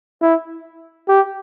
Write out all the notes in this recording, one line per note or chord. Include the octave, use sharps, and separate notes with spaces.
E4
G4